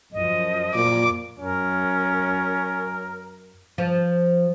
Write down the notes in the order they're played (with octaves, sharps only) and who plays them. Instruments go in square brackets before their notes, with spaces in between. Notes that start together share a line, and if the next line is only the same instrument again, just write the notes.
[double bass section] F#2 F3 [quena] D#5
[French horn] A#2 [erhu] D6
[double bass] F#2 [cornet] C#4 [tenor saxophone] A#4
[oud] F3